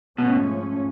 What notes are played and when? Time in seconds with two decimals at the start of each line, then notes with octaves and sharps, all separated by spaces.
0.18 G#2 B2 F3 A3 C#4